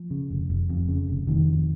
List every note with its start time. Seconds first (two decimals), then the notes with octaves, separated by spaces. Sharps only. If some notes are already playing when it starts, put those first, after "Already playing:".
Already playing: F3
0.11 C#3
0.30 F1
0.50 F1
0.69 F2
0.88 C#3
1.08 F1
1.27 F1 D#3
1.47 F2